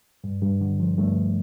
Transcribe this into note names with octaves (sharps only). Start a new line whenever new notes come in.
G2
G2
D3
F3
G2 A3